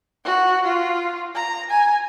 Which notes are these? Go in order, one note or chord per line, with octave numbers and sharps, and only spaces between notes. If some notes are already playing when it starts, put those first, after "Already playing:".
F#4
F4
A#5
G#5